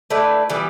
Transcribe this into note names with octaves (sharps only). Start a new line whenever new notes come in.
A3 E4 B4 D5
E3 G3 B3